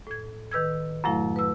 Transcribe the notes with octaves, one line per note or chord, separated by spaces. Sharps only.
A2 G#6
D#3 B4 E6 G#6
F#2 A2 F#3 A3 E4 F5
B4 E6